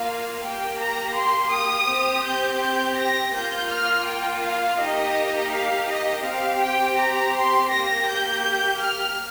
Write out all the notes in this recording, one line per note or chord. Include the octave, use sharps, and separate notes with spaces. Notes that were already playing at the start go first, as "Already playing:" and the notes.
Already playing: A#3 F4 F5
A#3 G4 G5
A#5
C6
D#6
C4 G4
G6
G6
A#6
A#3 F4 G6
F6
G5
F5
A#3 D#4 G4 D#5
F5
D#5
C4 G4 F5
G5
A#5
C6
A#3 G4 A#6
G6
F6